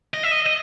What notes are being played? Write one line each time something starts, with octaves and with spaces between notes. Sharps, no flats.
D#5
E5
D#5
D#5